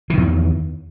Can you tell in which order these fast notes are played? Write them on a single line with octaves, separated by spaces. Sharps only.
E3 D#3 E2